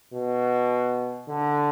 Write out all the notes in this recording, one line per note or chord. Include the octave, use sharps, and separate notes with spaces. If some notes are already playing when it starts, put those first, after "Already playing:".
B2
D3